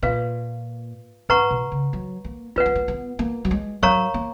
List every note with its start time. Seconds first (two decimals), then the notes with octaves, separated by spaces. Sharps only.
0.03 A#2 F4 B4 F5
1.29 G#2 B4 F#5 A#5 C#6
1.51 B2
1.72 C#3
1.93 F#3
2.25 A#3
2.56 A#3 F4 B4 F#5
2.66 B3
2.75 A#3
2.88 B3
3.19 A#3
3.45 F#3
3.51 G#3
3.83 F#3 A#4 C#5 F5 A#5 C#6
4.14 A#3